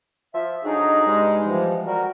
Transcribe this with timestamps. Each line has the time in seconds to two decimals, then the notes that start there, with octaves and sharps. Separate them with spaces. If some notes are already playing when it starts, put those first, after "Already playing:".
0.35 F3 E5
0.64 F2 F#3 D4 D#4 G#4
1.06 G2 B2 G#3
1.44 E3 F3 G3
1.86 G3 F#4 A#4